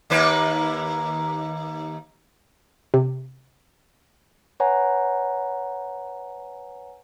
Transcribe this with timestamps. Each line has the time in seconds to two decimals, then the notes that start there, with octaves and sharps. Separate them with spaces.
0.10 D#2 A#3 B4
2.94 C3
4.60 B4 C#5 F#5 G#5 A#5